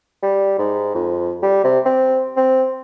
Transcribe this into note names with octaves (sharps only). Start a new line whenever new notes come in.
G3
G#2
F2
G3
C3
C4
C4